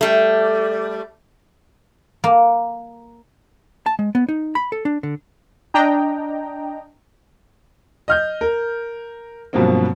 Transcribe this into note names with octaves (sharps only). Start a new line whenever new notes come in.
G3 A3
A#3
A5
G#3
B3
D#4
B5
A4
D4
D3
D4 D#5 G5 A#5
D#5 F6 G6
A#4
G2 B2 F3 F#3 A#3 C4